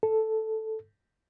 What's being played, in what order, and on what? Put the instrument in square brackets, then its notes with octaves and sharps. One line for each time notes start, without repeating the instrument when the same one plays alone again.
[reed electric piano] A4